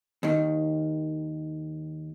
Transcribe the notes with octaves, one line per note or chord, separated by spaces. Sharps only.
D#2 D#3